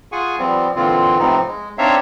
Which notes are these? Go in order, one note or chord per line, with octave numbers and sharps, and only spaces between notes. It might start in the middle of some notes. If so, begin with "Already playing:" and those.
F4 G#4 F#5 G#5 C#6
F3 G3 B3 C4
A#2 D3 E3 C4 F4
A2 C3 F3 B3 C4 D#4
G#3
C4 D4 D#4 C#5 E5 F5